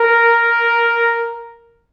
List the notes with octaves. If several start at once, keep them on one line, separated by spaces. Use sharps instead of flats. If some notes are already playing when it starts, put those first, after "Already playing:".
Already playing: A#4